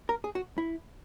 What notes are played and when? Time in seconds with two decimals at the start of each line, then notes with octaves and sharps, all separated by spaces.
0.09 A#4
0.24 G#4
0.35 F#4
0.58 E4